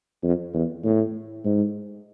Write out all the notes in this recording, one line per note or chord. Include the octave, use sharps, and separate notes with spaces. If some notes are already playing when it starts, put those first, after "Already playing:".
F2
E2
A2
G#2